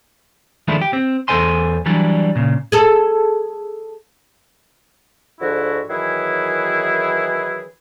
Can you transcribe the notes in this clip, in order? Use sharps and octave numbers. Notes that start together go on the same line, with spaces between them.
D#3 F3 G#3 A3 D4 E4
G4
C4
E2 G#2 A4 C5 G#5 C6
E3 F#3 G3 D4
A#2 C#3
G#4 A4
G#2 D3 F3 E4 F#4
D#3 E3 F#3 E4 G#4 B4